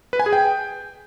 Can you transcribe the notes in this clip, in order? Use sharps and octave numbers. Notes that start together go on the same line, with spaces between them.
B4
G#5
G#4
G5